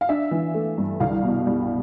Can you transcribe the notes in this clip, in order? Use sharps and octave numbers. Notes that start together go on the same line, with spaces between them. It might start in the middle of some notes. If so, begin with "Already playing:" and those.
F5
D4 E5
E3
A3
G2
C2 F5
B2
G3